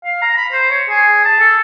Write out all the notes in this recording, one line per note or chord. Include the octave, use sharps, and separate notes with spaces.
F5
A#5
B5
C5
C#5
G#4
A5
A4